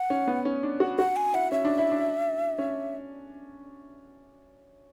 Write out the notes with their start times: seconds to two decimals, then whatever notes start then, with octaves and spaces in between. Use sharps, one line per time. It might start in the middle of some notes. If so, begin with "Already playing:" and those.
Already playing: F#5
0.10 C#4
0.27 B3
0.45 C#4
0.63 D4
0.80 F#4
0.99 F#4 F#5
1.16 G#5
1.34 E4 F#5
1.52 C#4 E5
1.65 D4
1.78 E4
1.92 D4
2.58 C#4